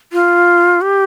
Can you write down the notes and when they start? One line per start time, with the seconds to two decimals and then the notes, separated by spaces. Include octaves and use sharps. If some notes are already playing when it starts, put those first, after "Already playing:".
0.13 F4
0.81 G4